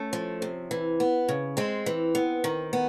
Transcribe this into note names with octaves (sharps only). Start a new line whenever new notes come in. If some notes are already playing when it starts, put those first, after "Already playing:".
Already playing: A3 C#4
F3
C3
E3
B3
C#3
G#3 C4
E3
B3
D#3
B3